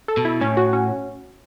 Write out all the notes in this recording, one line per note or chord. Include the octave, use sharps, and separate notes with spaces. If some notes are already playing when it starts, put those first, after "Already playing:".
A4
B2
E4
A2 C#4
F#4
C#4